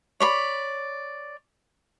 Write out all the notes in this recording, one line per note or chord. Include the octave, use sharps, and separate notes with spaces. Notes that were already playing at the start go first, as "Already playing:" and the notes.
C#5 D5 B5